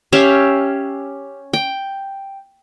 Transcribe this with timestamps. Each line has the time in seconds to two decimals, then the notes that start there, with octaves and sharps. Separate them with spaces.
0.12 C#4 G4 E5 F5
1.53 G5